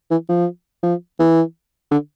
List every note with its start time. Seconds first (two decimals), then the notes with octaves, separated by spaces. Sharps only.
0.11 E3
0.29 F3
0.83 F3
1.20 E3
1.92 D3